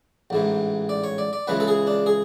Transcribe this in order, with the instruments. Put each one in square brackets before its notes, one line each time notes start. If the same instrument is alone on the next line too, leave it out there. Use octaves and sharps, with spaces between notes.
[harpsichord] A1 G#2 E3
D5
C#5
D5
D5
C#2 C#3 E3 G#3 B4
A4
G#4
D4
G#4